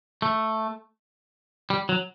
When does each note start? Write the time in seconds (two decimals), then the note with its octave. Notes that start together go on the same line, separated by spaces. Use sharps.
0.22 A3
1.70 G3
1.89 F#3